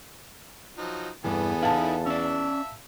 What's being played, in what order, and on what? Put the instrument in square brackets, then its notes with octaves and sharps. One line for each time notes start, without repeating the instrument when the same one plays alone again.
[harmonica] F3 F#3 D#4
[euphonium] E2 [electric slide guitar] G2 E3 [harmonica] B3 G#4 A4
[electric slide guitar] D#4 E4 [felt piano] F5 A5
[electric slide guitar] C#4 D5 [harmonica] E5 E6